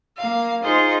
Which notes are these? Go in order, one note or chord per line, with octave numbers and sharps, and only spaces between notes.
A#3 F5
D#4 F4 G#4 C5